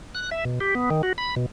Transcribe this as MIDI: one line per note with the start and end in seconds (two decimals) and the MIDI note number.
0.15 0.30 90
0.31 0.44 76
0.45 0.59 47
0.61 0.74 67
0.75 0.90 59
0.90 1.02 51
1.03 1.13 66
1.18 1.35 83
1.36 1.46 47